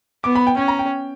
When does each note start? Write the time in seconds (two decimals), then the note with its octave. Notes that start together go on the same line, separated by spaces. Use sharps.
0.24 B3 D6
0.35 B5
0.47 G5
0.57 C#4 G5
0.68 A#5
0.79 G5